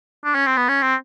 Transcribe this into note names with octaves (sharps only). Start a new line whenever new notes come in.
D4
C#4
C4
B3
C#4
C4